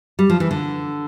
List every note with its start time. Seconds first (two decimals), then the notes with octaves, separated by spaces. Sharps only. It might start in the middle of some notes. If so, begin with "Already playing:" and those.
0.19 G3
0.30 F3
0.40 E3
0.51 D3